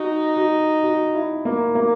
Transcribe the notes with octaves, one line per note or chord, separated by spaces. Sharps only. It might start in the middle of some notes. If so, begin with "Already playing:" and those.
Already playing: D#4 F#4
F#4
F#4
E4
A#3
A#3